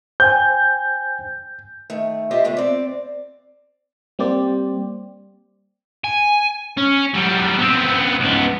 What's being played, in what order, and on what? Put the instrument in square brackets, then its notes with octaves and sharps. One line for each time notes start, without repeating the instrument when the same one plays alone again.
[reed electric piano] C5 G5 G#5 [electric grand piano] G6
[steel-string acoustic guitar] D#3 A3
F4 G4 C5 D#5 E5
C#3 G#3 A3 B3
C4 D5
[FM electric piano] G3 A#3 C4 G4 C5 D5
[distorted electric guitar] G#5
C#4
F#3 G3
B3 C4
C#2 B3